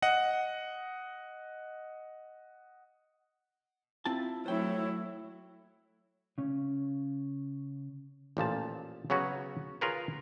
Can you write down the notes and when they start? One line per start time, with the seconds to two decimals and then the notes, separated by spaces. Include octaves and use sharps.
0.02 D#5 F#5
4.06 C4 E4 F4 A5
4.46 F#3 A3 E4 C5 C#5 G5
6.38 C#3 C#4
8.37 A1 A#2 F3 A5
9.10 C#3 F#3 B3 C#4 F#4
9.81 F4 G#4 A#4 B4 C#5